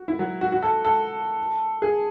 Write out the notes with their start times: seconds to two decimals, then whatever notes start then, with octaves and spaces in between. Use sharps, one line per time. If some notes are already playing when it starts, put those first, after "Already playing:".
Already playing: F#4
0.08 E4
0.19 F#3
0.41 F#4
0.52 F#4
0.62 A4
0.85 A4
1.82 G#4